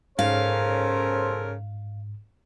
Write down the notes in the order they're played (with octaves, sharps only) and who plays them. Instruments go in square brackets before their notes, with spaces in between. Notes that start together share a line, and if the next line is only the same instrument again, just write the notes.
[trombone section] B1 A4 C5 [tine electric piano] G#2 [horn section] C#3 C#4 A#4 [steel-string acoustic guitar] F5